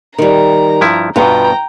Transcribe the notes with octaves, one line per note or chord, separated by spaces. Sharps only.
D#3 G3 A#5
G2 F3 E4
G2 B2 B3 F4 G5 A#5